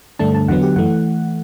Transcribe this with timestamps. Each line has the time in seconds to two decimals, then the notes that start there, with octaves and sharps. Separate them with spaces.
0.19 G2 D3 A3 D4 A5
0.35 A5
0.48 E2 D3 F#3 B3 F#5
0.62 G4
0.76 F#2 E3 A3 F#5